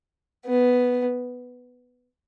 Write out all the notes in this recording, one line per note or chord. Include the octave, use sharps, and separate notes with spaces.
B3